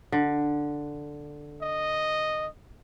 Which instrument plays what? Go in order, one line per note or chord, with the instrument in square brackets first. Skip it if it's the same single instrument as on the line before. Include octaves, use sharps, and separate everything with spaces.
[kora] D3
[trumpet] D#5